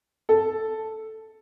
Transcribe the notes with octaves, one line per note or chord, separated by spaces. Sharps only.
A4